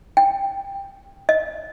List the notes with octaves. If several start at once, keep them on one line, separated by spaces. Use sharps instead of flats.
G5
D#5